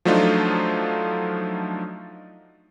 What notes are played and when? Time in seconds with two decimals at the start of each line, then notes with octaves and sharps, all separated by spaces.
0.05 F3 F#3 A3 D4 D#4 F4